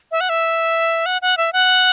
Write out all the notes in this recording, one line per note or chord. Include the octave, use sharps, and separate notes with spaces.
E5
F#5
E5
F#5
F#5
E5
F#5